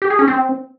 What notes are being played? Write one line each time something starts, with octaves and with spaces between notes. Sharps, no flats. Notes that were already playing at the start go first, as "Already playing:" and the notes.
G4
G#4
C#4
C4